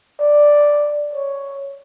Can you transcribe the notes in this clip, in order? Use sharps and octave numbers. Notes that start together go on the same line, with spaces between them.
D5
C#5